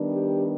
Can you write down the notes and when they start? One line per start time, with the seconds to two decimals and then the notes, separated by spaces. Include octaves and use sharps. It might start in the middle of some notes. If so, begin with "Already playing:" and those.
Already playing: D#3 G3 B3 D4
0.12 G4